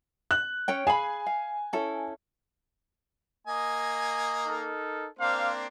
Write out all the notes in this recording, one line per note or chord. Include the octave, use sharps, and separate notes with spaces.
F#6
C#4 C#5 G5
G#4 F5 G#5 B5
F5
C#4 E4 A4
A#3 D#5 G#5
D#4 A4 A#4
A#3 C4 D4 C5 F5